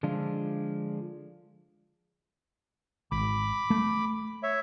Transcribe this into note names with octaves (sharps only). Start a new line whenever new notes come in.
D3 F3 G#3 D4 F4
G#1 B5 D6
A3
C#5 E5